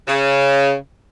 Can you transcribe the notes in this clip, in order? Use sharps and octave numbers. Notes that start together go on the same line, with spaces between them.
C#3